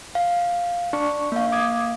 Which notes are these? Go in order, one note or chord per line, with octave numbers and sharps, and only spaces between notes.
F5
D4 C#6
A#3 F5
D6 D#6 G#6